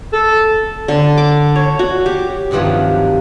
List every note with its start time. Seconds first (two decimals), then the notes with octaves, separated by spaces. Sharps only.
0.13 A4
0.88 D3
1.17 D6
1.56 C#5
1.79 F#4
2.06 G4
2.51 G2 C3 D#3 F3 F#3